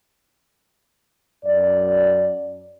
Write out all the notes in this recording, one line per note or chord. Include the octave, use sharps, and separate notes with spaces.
F#2 D5